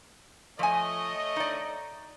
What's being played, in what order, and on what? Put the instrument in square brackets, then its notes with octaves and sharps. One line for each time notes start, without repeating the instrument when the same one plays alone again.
[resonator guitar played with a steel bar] F3 G#5 [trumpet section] A3 C#5 D#5
[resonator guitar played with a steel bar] D#4 D5